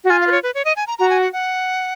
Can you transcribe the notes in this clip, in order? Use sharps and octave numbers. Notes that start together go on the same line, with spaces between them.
F#4
F4 G#5
F5
B4
C#5
B4
C#5
D#5
G#5
A#5
F#4 A#5
G#5
F#5
F#5